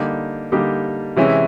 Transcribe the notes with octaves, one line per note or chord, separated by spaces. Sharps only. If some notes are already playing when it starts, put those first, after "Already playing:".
Already playing: D3 G3 A#3 D#4 G4
D3 G3 A#3 D#4 G4
C3 E3 G#3 C#4 E4